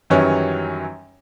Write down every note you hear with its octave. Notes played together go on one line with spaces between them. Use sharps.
F#2 D#3 E3 F#3 G3 C#4